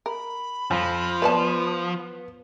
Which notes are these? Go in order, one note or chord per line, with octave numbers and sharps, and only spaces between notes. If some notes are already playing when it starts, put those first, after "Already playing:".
A#4 B5
F2 F3
B3 C5 D5 A5